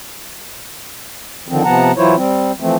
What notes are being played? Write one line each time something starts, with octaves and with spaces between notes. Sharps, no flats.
D3 D#3 F3 C4
C3 F3 B3 F#5 A5 A#5
E3 F#3 E4 F4 C5 C#5
G3 C4
E3 F3 A3 C4